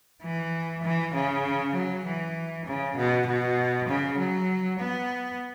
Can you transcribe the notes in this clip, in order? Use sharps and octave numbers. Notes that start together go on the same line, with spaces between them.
E3
E3
C#3
F#3
E3
C#3
B2
B2
C#3
F#3
B3